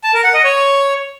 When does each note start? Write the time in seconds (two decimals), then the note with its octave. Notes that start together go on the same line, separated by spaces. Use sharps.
0.04 A5
0.14 A#4
0.24 F#5
0.34 D#5
0.44 C#5